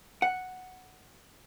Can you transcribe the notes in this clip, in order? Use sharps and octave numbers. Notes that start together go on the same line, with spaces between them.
F#5